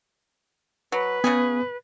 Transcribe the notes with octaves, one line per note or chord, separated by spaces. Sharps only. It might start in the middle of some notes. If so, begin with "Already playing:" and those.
F#3 B4
C#3 B3 C#4 G#4